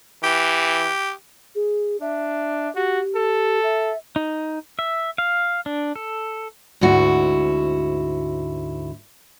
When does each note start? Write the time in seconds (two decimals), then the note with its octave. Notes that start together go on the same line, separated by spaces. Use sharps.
0.23 E3 G4
1.55 G#4
2.01 D4 E5
2.75 F#4 G4
3.15 A4
3.63 E5
4.16 D#4
4.79 E5
5.18 F5
5.66 D4
5.96 A4
6.81 D2 G#2 E4 F#4